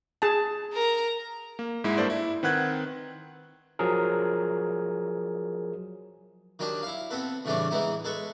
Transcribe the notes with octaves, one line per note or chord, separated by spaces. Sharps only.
G#4 A5
A#4 A#5
A#3
G#2 G#3 E4
G2 A#3 A4 C5 D5
E4
D#3 C4 B4 F#5 F#6 G#6
F3 F#3 G#4 A#4
D#3 F#3 D4 G4
E4 F5
B3 C4 A4 B4
A2 C#3 E3 G3 C#4 D4
E3 G#3 B3 D#4 E4
G#3 A4 B4 C#6